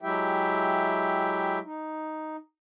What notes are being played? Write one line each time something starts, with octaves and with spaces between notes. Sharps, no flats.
F#3 G#3 E4 G4 E5 G5
D#4